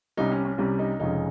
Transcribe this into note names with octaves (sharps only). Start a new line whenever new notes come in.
C2 C3 G3 C#4 D#4
C#4
C#4
C2 C3 G3 C#4
D#4
F1 F2 C#3 G#3 C#4 D#4